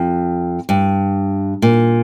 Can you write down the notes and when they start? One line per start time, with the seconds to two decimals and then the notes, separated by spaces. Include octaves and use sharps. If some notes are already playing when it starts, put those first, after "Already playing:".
Already playing: F2
0.69 G2
1.62 A#2